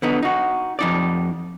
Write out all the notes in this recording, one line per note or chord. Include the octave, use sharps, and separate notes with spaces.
D3 B3 D#4
D#4 F#4
F2 D#4 D5